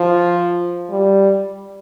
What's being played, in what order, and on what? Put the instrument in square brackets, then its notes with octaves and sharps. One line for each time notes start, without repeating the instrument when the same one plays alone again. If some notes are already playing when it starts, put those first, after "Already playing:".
Already playing: [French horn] F3
G3